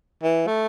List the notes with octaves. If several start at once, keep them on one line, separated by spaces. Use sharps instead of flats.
E3
A3